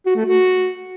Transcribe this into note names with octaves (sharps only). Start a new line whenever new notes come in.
F#4
A3
F#4